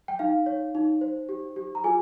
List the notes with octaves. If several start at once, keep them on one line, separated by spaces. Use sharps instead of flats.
G5
D#4 F5
C#5
D#4
C5
G4
G4
A#5
F4 G#4 G#5